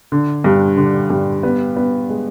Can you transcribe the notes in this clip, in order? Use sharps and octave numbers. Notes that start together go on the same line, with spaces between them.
D3
G2
D3
G2
B3
B3
G#3